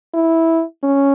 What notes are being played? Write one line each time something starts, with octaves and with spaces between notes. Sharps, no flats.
E4
C#4